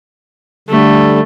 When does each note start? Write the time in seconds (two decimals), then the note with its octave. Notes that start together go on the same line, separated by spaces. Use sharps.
0.69 D3 G3 A3